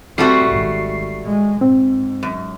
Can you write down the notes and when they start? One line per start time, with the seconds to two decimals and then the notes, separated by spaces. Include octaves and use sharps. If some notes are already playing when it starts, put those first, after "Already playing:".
0.18 G3 A3 C4 F#4 C7
0.49 G#1
1.24 G#3
1.61 G#2 C4
2.23 F#2